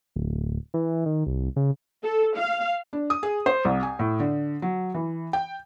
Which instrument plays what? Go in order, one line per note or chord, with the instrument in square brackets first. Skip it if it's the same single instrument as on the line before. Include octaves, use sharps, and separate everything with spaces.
[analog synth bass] D1
E3
D#3
C2
C#3
[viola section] A4
F5
[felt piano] D4
D#6
G#4
C5
C2
G#5
A2
D3
F#3
E3
G5